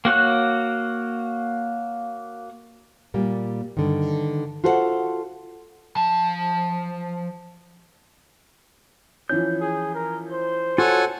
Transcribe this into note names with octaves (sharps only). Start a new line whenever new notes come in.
A#3 F#4 C#5 F#6
A#2 G3 A#3
G2 D3 D#3
F4 F#4 A4 C5 E5 F#5
F3 A5
E3 F3 C#4 G6
G#4
A#4
C5
F4 F#4 A4 C#5 F#5 G#5